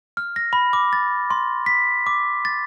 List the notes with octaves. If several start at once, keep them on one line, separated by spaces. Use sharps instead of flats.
F6
A#6
B5
D6
A6
C6
B6
D6
A6